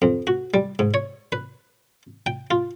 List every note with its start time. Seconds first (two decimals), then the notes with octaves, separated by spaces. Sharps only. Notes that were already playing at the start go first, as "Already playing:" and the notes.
0.02 F2
0.27 F#4
0.54 G3
0.79 G#2
0.94 C#5
1.32 B4
2.26 G5
2.51 F4